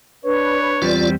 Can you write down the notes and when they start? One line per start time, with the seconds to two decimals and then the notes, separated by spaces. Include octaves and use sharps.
0.24 D4 B4 C#5
0.82 E2 G3 C4 F4 D5